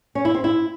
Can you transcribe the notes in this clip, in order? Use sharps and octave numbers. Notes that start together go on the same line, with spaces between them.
C#4
E4
C4
E4